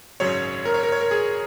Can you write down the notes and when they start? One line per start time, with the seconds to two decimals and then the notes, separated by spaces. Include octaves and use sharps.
0.20 G#1 F#2 C#3 F#3 C#5
0.65 A#4
0.74 C#5
0.83 A#4
0.92 C#5
1.01 A#4
1.11 G#4